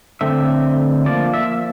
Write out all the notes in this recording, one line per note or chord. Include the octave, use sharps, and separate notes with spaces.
D3 A3 C4 E5
F3 A#3 D5
E5